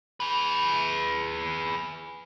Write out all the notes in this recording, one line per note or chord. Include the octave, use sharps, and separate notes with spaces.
G#4 B4